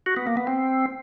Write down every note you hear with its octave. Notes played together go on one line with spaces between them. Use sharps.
F#4
B3
A#3
B3
C4